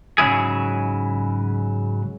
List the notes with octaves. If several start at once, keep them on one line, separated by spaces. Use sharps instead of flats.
G#2 C#3 F#3 E4 G#4